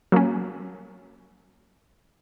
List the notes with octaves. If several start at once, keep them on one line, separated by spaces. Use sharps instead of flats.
F#3 A#3 C#4